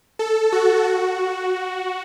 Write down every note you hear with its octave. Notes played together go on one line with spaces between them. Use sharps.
A4
F#4
F#4